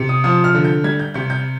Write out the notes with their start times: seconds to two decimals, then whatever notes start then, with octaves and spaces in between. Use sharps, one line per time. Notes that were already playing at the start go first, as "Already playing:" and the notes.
Already playing: C3
0.09 D#6
0.24 F3 D#6
0.44 F6
0.54 D3
0.64 G6
0.84 G3 G#6
0.99 G6
1.14 C3 G6
1.30 G6